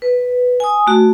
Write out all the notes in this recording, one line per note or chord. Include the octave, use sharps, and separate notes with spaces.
B4
G#5 D#6
A3 F#4